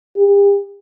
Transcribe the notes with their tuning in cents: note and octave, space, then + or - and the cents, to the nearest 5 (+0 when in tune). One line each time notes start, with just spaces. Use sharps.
G4 +40